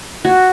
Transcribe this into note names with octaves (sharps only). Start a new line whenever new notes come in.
F#4